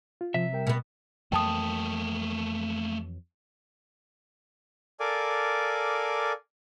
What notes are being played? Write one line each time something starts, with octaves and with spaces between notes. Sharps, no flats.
F4
C3 F3 E5
G3 A#4 G5
B2 B3
F2 E3 F#3 A3 A#3 G5 A5 D#6
A4 A#4 D5 F5 G#5 D6